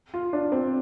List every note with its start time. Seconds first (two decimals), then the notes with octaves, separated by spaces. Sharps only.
0.14 F4
0.33 D4
0.52 C4